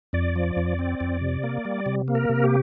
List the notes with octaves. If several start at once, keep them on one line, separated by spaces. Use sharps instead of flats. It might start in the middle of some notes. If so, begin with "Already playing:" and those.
F2 D5
F3
F2
C4
F2
C3
A#3
G3
C3
A#3
A#4
C3
G4